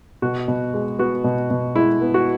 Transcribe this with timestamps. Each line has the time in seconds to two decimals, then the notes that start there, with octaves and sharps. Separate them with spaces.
0.22 B2 F#4
0.48 B2
0.74 G#3
0.99 B3 F#4
1.24 B2
1.50 B2
1.76 G#3 E4
2.01 B3
2.14 F#4